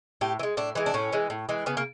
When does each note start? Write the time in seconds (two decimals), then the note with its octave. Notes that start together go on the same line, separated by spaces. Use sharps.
0.21 A2 G4
0.39 E3
0.43 G#3
0.57 A2 D4
0.75 E3 G#3
0.86 D4
0.94 A2 C#4
1.12 E3 G#3
1.30 A2
1.49 E3 G#3
1.66 C#3 B3
1.77 A#3